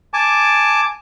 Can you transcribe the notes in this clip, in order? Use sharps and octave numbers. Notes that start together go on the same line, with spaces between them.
G#5 A5 D6